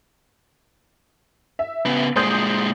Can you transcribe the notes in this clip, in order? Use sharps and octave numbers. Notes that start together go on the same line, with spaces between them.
E5
C#3 B3
A#2 G#3 C5 D#6 G6